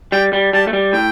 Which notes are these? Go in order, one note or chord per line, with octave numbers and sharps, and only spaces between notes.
G3 G5
G3
G3 A5
A3
G3
A2 G5